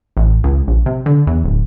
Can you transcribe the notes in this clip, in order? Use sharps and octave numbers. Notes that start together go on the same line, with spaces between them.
A1
C#2
A#1
C3
D3
E2
D1